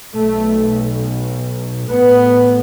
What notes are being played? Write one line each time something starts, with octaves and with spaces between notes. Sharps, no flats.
B1 B2 A3
A1 A2 B3